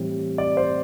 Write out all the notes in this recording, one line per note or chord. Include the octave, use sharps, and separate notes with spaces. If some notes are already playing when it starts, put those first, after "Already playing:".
Already playing: A2 E3 G3 C4
D5
C5